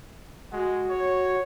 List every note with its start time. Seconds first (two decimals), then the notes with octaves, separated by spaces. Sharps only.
0.52 G#3 F#4
0.90 C#5